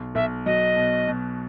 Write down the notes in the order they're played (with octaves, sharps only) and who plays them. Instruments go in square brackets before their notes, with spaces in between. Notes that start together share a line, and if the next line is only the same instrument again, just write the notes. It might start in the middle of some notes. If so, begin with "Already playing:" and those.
Already playing: [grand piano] B1
[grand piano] B1 [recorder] E5
[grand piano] F#3 [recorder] D#5
[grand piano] B2
B2